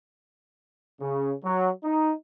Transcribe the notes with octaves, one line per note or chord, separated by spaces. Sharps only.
C#3
F#3
D#4